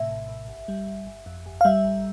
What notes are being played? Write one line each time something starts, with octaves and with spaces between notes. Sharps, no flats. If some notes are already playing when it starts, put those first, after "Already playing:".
Already playing: A2 C3 E5
A#1
A#1
G1
G3
G1
G1
F2
G1
F5
G3 E5
A1